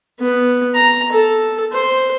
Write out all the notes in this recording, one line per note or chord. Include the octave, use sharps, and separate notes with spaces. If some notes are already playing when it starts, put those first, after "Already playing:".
B3
A#5
A4
C5